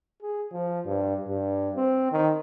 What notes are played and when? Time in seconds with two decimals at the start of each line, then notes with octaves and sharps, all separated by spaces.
0.22 G#4
0.52 F3
0.85 G2
1.27 G2
1.76 C4
2.11 D#3